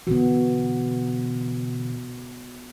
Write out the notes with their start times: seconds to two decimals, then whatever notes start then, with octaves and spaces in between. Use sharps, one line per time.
0.07 B2 D3 E3 B3 F#4